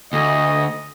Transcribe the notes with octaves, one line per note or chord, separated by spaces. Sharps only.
D2 D#5